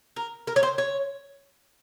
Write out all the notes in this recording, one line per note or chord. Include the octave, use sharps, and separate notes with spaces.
A#4
A#4
C#5
C5
C#5